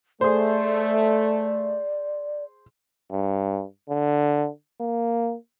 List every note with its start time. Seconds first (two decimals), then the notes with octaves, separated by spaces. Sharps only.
0.21 A3 G#4 C5 D5
3.12 G2
3.90 D3
4.81 A#3